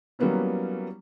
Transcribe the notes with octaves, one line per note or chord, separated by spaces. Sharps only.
F#3 G3 A#3 B3 C#4 E4